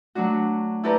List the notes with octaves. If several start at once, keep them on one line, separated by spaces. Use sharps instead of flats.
F#3 A3 D4 F#4
E4 G4 A4 B4 D5 A#5